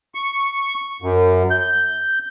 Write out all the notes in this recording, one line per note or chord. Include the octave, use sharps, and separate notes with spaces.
C#6
F#2
G6